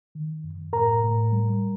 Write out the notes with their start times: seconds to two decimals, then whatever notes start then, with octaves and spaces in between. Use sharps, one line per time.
0.15 D#3
0.44 F#2
0.73 A2 A#4 A#5
1.04 A2
1.32 G3